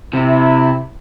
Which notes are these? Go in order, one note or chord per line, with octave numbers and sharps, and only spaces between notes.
C3 E4